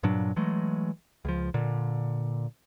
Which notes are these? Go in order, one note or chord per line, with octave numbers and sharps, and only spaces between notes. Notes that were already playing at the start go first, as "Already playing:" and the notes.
G2 A#2 F#3 D4
E3 F#3 G#3 A3
C#2 F3
A#2 D3